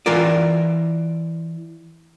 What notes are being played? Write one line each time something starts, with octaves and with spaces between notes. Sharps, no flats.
E3 F4 A#4 D5